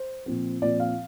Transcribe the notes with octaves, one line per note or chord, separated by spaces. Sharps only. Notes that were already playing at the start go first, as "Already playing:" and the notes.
Already playing: C5
A#2 F3 C4
A#2 F3 C4 D5
F5